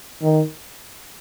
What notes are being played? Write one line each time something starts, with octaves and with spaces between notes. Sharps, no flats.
D#3